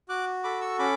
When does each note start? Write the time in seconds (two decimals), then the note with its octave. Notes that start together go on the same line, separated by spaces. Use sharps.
0.09 F#4 D6 F#6
0.44 A4 B5 D6
0.61 C#6 E6
0.79 C#4 B5 D6